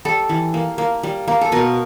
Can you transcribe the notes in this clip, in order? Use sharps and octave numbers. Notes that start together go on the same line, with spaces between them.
G3 A4
E3
A#3
A#3
G3
A#3
A4
B2 A#4